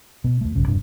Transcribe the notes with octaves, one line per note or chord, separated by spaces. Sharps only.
B2 B3
D#2 A3
A#1 G2 C#3
E1 G2 C3 D4